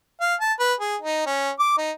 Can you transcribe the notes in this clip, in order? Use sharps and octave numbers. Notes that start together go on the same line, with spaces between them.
F5
A5
B4
G#4
D#4
C#4
D6
D#4